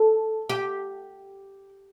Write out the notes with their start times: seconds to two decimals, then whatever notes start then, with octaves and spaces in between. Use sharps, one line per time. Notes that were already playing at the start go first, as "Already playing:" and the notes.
Already playing: A4
0.49 G4